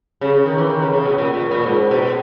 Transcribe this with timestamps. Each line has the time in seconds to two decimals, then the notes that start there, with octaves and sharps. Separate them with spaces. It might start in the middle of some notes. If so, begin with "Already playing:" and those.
0.21 C#3
0.33 C#3
0.46 D#3
0.58 E3
0.70 D#3
0.82 C#3
0.93 C#3
1.06 B2
1.18 A#2
1.34 A#2
1.51 A#2
1.66 G#2
1.91 B2